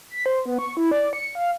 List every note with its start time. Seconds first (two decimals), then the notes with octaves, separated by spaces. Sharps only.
0.10 B6
0.26 C5
0.46 B3
0.59 C#6
0.77 E4
0.91 D5
1.13 C#7
1.35 F5